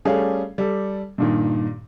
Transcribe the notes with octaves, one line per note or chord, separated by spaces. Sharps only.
G3 A3 C#4 G#4 F5
G3 A4
G2 A#2 D#3